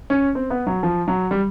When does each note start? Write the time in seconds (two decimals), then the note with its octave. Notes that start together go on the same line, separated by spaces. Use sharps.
0.10 C#4
0.35 C4
0.50 B3
0.67 F#3
0.83 F3
1.08 F#3
1.31 G3